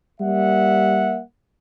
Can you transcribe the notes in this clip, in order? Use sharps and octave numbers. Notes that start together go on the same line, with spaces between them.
G3 A#3 E5 F#5